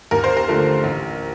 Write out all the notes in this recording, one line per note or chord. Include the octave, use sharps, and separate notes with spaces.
D#2 A#4
C5
A#4
D3 F3 A3
A1